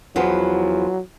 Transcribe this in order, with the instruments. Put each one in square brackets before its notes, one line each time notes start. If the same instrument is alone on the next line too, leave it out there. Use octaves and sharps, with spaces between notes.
[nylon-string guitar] E2 F3 B3 [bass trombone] F#3